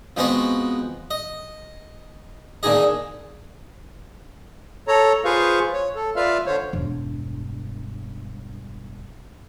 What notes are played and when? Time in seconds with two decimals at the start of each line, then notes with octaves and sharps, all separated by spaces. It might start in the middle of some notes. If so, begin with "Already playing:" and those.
0.17 F3 G#3 B3 C4 F#4 D#5
1.11 D#5
2.63 A#2 D3 D#4 G#4 D#5
4.88 A4 C#5 A#5
5.25 F4 G#4 B4 C5 F5 C#6
5.73 C#5
5.95 A4
6.16 F4 B4 D5 E5 F5 F6
6.46 D3 C5 C#5
6.73 E1 G2